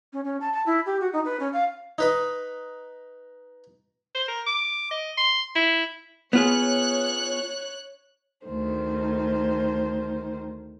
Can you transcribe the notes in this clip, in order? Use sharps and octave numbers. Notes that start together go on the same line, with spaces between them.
C#4
C#4
A5
A5
E4
G4
F#4
D#4
B4
C#4
F5
D#4 B4 D#5
C5
A#4
D6
D#5
C6
E4
B3 F4 G#4 C#5 F#6
D2 D#3 C5